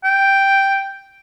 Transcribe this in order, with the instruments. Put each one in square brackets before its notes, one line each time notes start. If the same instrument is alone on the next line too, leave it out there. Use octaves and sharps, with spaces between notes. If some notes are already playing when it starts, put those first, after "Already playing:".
[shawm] G5